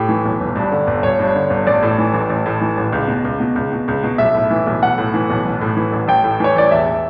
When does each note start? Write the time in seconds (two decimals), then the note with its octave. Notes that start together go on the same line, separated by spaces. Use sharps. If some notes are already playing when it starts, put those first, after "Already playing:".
Already playing: A2 G4
0.09 E3
0.25 B1
0.40 G1
0.56 G2
0.72 D3
0.87 G1
1.03 G1 C#5
1.19 G2
1.36 D3
1.50 G1
1.67 A1 D5
1.83 A2
1.99 E3
2.14 A1
2.30 A1
2.46 A2
2.61 E3
2.77 A1
2.93 C#2
3.08 B2
3.25 C#2
3.40 B2
3.56 C#2
3.72 B2
3.88 C#2
4.03 B2
4.18 B1 E5
4.34 A2
4.50 E3
4.66 B1
4.82 B1 F#5
4.98 A2
5.14 E3
5.30 B1
5.45 A1
5.61 A2
5.77 E3
5.93 A1
6.08 A1 G5
6.24 A2
6.40 E3 C#5
6.56 A1 D5
6.71 E1 E5